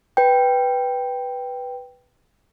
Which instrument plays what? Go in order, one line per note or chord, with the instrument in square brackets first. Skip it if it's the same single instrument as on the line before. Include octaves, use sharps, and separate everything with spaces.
[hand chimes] B4 G5